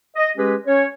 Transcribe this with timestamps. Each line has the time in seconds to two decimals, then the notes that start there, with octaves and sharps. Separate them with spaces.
0.16 D#5
0.37 G#3 C#4 G4 G#4 B4
0.65 C#4 C#5